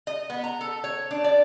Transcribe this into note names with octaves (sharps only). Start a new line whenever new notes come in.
D#5
B3
A#5
A4
C#5
D4
D5